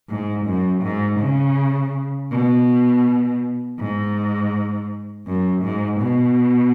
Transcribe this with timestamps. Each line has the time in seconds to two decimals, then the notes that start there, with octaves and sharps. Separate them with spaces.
0.10 G#2
0.46 F#2
0.83 G#2
1.20 C#3
2.31 B2
3.79 G#2
5.27 F#2
5.63 G#2
6.01 B2